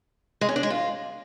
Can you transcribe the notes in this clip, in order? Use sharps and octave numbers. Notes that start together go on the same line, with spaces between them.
G#3
C#4
D4
G#3
F4